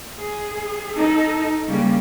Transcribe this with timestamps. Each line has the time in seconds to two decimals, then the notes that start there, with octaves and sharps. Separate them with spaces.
0.19 G#4
0.97 D#4 A4
1.68 C#3 G3 A#3